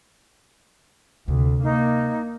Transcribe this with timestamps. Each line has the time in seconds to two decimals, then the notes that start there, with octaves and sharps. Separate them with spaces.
1.28 D2 C3
1.63 A#3 D#4